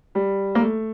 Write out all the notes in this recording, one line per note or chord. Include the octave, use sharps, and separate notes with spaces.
G3
A#3
A3